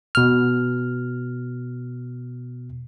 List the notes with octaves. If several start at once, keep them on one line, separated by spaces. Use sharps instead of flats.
B2 F6